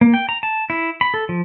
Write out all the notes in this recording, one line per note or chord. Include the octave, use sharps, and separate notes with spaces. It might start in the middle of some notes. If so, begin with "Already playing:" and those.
A#3
G5
A#5
A5
E4
B5
A4
F3